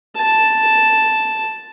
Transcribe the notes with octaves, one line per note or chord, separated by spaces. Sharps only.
A5